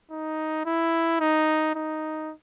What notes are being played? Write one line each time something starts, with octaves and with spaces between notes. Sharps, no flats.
D#4
E4
D#4
D#4